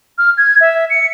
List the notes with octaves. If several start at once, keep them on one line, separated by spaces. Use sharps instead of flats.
F6
G#6
E5
C#7